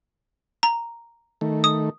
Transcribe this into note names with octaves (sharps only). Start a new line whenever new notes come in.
A#5
D#3 A3
D#6